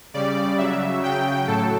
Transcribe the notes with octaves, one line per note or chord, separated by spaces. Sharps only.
C#3 G3 D5
C#3 F#3 E5
C#3 F#3 G5
A2 F#3 A4